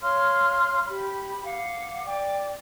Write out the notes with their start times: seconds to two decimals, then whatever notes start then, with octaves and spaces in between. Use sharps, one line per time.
0.02 C#5 F5 C6 F6
0.87 G4 B5
1.44 F5 F#5 D6
2.05 D5 G5 D6